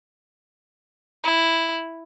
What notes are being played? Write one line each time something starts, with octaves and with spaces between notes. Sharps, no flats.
E4